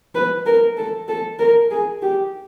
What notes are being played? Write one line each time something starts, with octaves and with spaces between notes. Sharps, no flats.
B4
A#4
A4
A4
A#4
G#4
G4